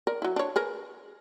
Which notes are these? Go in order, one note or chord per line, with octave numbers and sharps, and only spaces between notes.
A#4 D5
F#3 E4
D4 C#5
G#4 A#4 B4